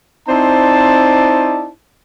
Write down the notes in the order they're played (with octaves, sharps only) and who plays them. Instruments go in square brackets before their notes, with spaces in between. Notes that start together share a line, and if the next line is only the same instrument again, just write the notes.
[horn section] C4 D#4 E4 C5 D5 A5